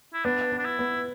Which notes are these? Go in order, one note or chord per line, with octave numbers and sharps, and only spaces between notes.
E4
B3 D4
B3
D4
E4
B3